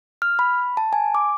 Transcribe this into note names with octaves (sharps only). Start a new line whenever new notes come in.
F6
B5
A5
G#5
D6